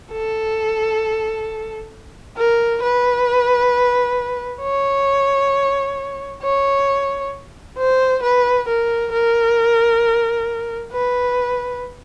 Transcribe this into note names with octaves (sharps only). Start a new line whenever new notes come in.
A4
A#4
B4
C#5
C#5
C5
B4
A#4
A#4
B4